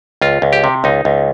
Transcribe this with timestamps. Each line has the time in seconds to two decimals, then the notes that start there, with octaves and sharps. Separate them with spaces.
0.22 C#2 F4
0.42 C#2
0.53 G4
0.64 C3
0.84 C#2 D#4
1.05 C#2